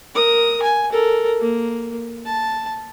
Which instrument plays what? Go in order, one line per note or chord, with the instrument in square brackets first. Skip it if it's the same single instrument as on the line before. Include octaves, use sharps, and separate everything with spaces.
[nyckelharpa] A#4 D#6
G#5
A4 A#4
A#3
A5